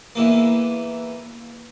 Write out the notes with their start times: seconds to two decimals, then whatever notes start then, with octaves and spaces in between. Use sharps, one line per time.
0.15 E2 E3 A#3